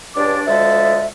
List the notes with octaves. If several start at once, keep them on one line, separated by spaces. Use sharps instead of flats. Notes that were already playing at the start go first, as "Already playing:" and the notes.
C#2 G2 D4 D5 D6
D2 F3 G#3 A4 E5